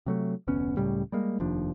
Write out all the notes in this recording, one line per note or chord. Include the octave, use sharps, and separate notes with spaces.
C3 F#3 A3
F1 D2 B3 C#4
C#2 A2 C#3 G3
G3 G#3 A#3
F1 D#2 F3 D4